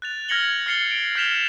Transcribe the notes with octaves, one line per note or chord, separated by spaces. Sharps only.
F#6 A6 F7
F6 G#6 A#6 C#7 F#7 G7
F6 A6 C7 C#7 F7 G7
D7
F6 G6 B6 E7 F7 G7